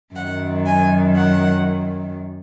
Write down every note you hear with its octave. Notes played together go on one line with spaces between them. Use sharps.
F#2 D#3 F#3 F#5
G#5
F#5